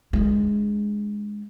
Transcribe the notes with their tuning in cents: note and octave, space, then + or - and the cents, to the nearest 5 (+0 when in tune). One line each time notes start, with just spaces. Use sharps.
G#3 +0 D4 +0